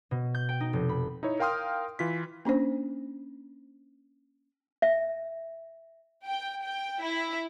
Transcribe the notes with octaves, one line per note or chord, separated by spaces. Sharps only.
B2
G6
G5
D#4
F1
B5
D#4 E4 C#5
A#4 F5 G5 C6 D#6 F6
E3 F4 B6
A#3 C#4 D4 C5
E5
G5
G5
E4